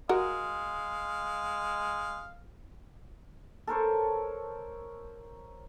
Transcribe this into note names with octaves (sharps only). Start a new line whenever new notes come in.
G#3 F#4 A#4 F5
A4 A#4 C5 C#5